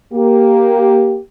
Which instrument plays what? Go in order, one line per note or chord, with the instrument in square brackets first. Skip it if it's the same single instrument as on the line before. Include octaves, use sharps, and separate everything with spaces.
[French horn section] A#3 G4